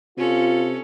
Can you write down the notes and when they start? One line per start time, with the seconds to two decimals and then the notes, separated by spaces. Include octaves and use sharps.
0.17 C3 C#4 F4 A4